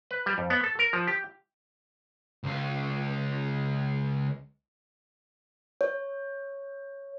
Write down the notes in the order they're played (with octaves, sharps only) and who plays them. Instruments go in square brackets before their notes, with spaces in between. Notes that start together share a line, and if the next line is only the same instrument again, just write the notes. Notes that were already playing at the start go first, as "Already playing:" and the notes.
[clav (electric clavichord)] B4
G3
F2
B3
A4
A#4
F3
G4
[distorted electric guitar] C#2 F4
[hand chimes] C#5